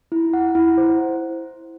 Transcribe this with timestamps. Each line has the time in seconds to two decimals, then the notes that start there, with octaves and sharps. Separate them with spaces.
0.12 E4
0.33 F#5
0.55 E4
0.78 C5